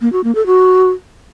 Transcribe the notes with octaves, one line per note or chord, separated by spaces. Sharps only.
A#3
F#4
A#3
A4
F#4